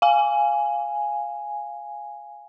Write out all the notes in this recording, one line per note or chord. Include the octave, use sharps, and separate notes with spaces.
F5 G#5